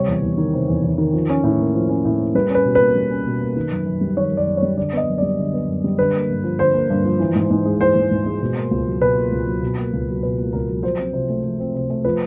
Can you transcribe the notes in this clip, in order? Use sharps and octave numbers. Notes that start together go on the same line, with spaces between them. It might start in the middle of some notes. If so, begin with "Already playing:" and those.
Already playing: C3 G3 C#5
E2
E2
D#3
C3
E2
E2
D#3
F3
C#4
A2
A#3
F3
C#4
A2
A#3
G3 B4
C#4
B4
B2
A#3 B4
G3
C#4
B2
A#3
D#3
F#2
F#2
G3
D#3 C#5
F#2
D5
F#2
C#5
G3
D3 D5
B3 D#5
F#2
G3 D5
D3
B3
F#2
G3
D3 B4
A#3
G2
F3
D3 C5
A#3
G2
F3
E3
G#2
G#2
G#3
E3 C5
G#2
G#2
G#3
B2
A#3
C#2
F#3
B2 B4
A#3
C#2
F#3
B2
A#3
C#2
F#3
B2 B4
A#3
C#2 A#4
F#3
F3 C5
C4
C3
A3
F3
C4
C3
A3
F3 B4